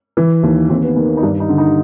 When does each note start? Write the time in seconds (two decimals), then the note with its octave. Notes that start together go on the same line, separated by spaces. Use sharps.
0.17 E3
0.43 D#2
0.69 D#2 C4
0.83 B3
0.96 D#3 A#3
1.17 D#4
1.23 G2 D4
1.40 D#4
1.49 D3
1.58 D#4